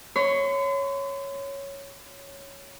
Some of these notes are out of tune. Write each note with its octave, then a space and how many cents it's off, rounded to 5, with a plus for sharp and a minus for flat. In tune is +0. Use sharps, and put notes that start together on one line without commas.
C#5 +0 C6 -45